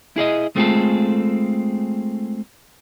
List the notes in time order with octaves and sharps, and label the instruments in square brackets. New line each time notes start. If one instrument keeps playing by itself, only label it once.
[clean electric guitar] E4 G#4 D5 D#5
G#3 A3 C4 F4 G#4 A4